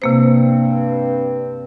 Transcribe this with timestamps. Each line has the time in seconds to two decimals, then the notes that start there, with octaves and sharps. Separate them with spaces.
0.02 G2 C3 A#3 C4 C5